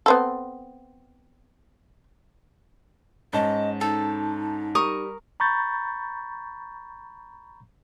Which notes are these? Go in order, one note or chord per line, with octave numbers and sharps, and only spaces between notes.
B3 C4 A4
G#2 C#4 D#5 A5
D#4 A4
G3 A#4 C#6 D#6
A#5 B5 C#6 G6 A6